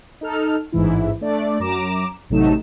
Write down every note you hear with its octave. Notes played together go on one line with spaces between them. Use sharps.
D#4 A4 F6
A1 G#2 E3 E4
A3 D4 D5
F#2 A#5 D6 E7
A1 C3 F#3 A3 D#4 E7